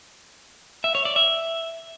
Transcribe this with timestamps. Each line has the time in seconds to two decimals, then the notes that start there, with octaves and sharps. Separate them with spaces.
0.84 E5
0.95 C#5
1.05 D5
1.16 E5